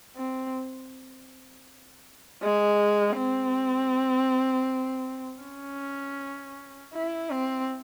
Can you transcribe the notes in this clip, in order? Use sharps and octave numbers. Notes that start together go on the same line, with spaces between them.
C4
G#3
C4
C#4
E4
C4